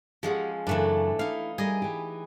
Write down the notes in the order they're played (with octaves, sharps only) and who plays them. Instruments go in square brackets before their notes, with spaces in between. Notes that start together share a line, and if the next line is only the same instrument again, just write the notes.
[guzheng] F3 G#3 C#4 [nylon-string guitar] G4 G#4 F#5
[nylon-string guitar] F#2 C#3 [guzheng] E3 A3 D4
[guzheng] D#4 F5 [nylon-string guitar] E4
[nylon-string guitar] G3 A#4 [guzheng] G#4 D#5
[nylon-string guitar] E3 G4